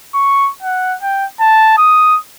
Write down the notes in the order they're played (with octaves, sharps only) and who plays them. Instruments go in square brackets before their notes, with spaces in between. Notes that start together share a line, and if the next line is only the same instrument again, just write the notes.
[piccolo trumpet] C#6
F#5
G5
A5
D#6